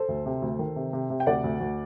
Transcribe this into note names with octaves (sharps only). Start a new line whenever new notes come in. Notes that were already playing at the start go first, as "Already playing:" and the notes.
Already playing: A4 C5
D2
C3
D2
D#3
C3
C3
C3
G5
D2 D5 F#5
D2
D2